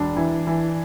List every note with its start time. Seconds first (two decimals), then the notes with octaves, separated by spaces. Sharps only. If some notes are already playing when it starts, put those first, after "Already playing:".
Already playing: E1 D4
0.16 E3
0.47 E3